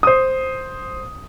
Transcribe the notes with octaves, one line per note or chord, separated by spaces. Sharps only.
C5 D#6